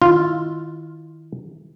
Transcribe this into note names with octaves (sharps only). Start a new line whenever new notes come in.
D#3 E4 F4